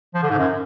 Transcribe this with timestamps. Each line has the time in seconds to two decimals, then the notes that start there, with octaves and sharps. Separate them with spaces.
0.14 F3
0.22 D3
0.30 G#2
0.38 F#2